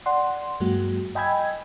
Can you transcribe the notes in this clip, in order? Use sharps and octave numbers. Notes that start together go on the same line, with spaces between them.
D5 F#5 C6
G2 F#3 G#3 A#3 F#4
D#5 G5 G#5 B5 E6 G#6